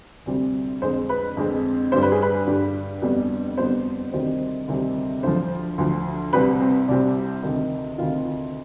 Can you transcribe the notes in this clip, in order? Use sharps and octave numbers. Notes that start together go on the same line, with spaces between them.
D2 C3 G3 C4
F2 D3 G#3 C4 C5
B4
F2 D3 G#3 C4
G2 D3 G3 C5
B4
G#4
B4
G2 D3 G3
F2 D3 G3 B3
F2 D3 G3 B3 C5
D2 C3 D#3 G3 C4 C5
D2 C3 D#3 G3 C4
D2 D3 F3 C5
D2 D3 F3
C2 C3 G3 C4 B4
C4
C2 C3 G3 C4 D4
D2 C3 D#3
D2 C3 D#3 F4